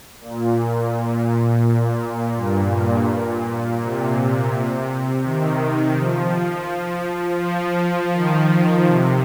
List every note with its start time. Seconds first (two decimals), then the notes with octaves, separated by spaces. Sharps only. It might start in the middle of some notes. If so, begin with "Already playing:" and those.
0.21 A#2
2.36 G2
3.09 A#2
3.80 C3
5.24 D#3
5.96 F3
7.40 F3
8.12 D#3
8.84 C3